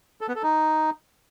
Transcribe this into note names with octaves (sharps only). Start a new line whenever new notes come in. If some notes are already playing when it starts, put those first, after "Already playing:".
A4
B3
A4
D#4